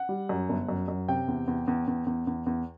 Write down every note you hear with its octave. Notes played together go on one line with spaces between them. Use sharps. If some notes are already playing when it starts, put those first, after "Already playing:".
Already playing: F#5
G3
F#2
G1
F#2
F#2
C3 G5
E2
E2
E2
E2
E2
E2
E2